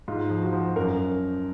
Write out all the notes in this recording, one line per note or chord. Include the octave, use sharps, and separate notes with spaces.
G#2 F4
F3
F#4
F3
F#2 A#4